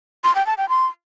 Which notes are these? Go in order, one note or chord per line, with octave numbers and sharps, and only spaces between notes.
C6
G5
A5
G5
C6